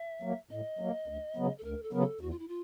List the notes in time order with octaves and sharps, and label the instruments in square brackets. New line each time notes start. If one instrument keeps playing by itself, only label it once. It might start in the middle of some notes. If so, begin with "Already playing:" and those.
Already playing: [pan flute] E5
[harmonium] F#3 A#3
[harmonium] A2 [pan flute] D#5
[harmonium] F#3 A#3
D2
C#3 F#3 B3
[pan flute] A4
[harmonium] D2 [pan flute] A#4
[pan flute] A4
[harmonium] C#3 F#3 B3 [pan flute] A#4
[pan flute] A4
[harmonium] E2 [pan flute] F#4
[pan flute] F4
E4
F4